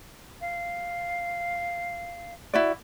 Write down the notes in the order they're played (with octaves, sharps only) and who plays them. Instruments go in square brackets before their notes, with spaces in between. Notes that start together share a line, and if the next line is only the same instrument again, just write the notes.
[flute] F5
[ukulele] E4 F#4 D5